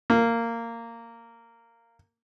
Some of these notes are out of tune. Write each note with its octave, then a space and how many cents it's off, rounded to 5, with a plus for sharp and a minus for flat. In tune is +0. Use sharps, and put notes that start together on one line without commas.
A#3 -15